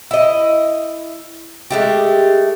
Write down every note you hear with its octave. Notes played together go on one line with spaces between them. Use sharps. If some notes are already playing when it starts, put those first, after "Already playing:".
E4 D#5
G#3 A3 G4